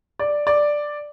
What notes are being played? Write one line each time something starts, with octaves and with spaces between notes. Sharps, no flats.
D5
D5